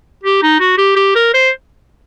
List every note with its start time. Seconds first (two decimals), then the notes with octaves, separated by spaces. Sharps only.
0.24 G4
0.43 D#4
0.60 F#4
0.78 G4
0.96 G4
1.15 A#4
1.34 C5